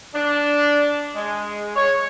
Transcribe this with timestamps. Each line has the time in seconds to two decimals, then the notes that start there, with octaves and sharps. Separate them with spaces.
0.14 D4
1.15 G#3
1.76 C#5